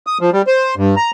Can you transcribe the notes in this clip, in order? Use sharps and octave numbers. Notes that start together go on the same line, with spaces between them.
D#6
F3
G3
C5
G2
A#5